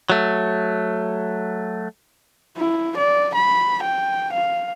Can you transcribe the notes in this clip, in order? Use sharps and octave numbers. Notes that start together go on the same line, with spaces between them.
F#3 A3
E4
D5
B5
G5
F5